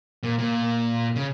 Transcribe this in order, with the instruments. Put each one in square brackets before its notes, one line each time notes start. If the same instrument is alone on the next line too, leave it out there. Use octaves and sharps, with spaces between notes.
[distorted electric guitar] A#2
A#2
C#3